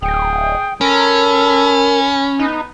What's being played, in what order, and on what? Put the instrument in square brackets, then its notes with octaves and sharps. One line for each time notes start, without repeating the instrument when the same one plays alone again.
[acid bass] D1 [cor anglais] G#4 [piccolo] G5
[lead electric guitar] C#4 [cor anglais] A4 [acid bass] A#4 [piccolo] B5
[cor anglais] B3 [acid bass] D#4